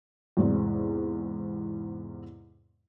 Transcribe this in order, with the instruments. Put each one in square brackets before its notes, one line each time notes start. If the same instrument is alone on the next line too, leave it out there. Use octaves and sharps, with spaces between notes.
[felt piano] E2 G#2 C3 G#3